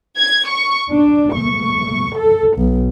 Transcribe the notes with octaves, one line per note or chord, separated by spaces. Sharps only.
G#6
C#6
D4
C#6
A4
B1